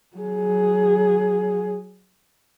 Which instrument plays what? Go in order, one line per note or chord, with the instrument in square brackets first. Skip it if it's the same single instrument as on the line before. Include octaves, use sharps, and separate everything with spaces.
[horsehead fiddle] F#3 G#4